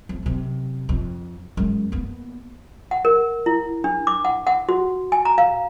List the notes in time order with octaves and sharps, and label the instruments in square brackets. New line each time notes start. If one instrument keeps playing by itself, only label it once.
[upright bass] F2
F#2 C3
F2
F#2 G#3
A#3 B3
[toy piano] F#5
A#4
E4
D4
D6
F#5
F#5
F#4
G#5
A#5
F5